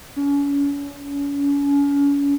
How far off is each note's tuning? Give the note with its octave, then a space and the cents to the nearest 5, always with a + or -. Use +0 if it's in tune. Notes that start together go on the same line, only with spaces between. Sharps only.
C#4 +35